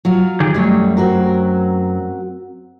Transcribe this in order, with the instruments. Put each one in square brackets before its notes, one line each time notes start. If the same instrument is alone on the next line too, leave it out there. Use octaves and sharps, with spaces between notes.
[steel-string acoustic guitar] F#3 F4
[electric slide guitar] D#3 G4 G#4
[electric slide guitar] F#2 F#3 [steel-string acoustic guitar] G3 A3
[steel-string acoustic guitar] C4 F#4 A#4